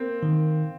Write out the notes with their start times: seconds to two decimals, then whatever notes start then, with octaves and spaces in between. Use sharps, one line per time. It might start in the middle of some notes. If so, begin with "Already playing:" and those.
Already playing: A#3 C4
0.23 D#3